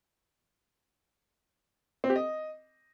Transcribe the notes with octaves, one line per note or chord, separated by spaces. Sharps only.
C4
G4
D#5